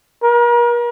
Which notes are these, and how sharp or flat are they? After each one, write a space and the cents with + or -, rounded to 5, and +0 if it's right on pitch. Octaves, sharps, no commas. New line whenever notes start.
A#4 +40